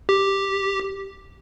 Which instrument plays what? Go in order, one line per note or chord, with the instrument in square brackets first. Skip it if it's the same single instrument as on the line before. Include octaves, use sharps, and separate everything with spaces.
[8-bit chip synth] G4